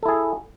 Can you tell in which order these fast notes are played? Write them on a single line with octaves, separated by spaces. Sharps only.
A4 E4 G#4